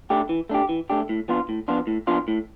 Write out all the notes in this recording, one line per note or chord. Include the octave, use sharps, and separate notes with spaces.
A3 D4 G4
E3
A3 D4 G4
E3
A3 D4 G4
A2
F3 B3 D4 F4
A2
F3 B3 D4 F4
A2
F3 B3 D4 F4
A2